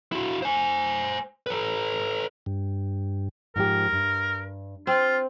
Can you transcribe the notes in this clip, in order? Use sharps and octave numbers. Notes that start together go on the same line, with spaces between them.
E4 F#4
C5 G#5
A4 B4
G2
G#2 F3 G4 A#4
G2
C4 F4